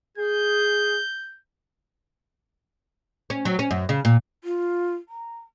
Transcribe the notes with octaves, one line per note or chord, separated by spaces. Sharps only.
G#4 G6
C#4
F#3
C#4
F#2
C#3
A#2
F4
A#5